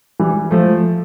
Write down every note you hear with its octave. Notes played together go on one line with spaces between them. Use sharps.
E3 G3
F3 A3